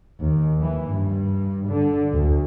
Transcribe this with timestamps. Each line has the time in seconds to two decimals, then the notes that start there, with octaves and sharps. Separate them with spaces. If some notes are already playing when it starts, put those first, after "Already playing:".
0.19 D#2
0.62 E3
0.93 G2
1.69 D3
2.13 D2